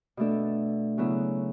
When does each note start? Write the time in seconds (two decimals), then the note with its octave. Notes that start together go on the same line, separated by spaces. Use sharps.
0.17 B2 A3 D4 A4
0.98 C#3 F#3 B3 E4